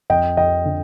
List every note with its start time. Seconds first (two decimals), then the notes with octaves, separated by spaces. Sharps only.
0.10 F2 D#5 G5
0.37 F2 D#5 G5
0.65 D3